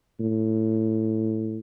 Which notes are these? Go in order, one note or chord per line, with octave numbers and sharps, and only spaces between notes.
A2